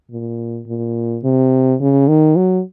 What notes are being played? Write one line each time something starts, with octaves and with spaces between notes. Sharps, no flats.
A#2
A#2
C3
C#3
D#3
F#3